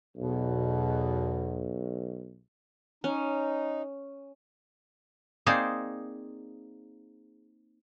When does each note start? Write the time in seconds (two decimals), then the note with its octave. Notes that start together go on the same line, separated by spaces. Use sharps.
0.17 B1 E2 B2
3.04 C#4 D#4
5.46 A#3 C4 D#4 G#4 C5 D5